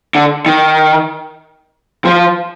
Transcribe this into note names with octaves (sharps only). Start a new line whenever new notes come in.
D3
D#3
F3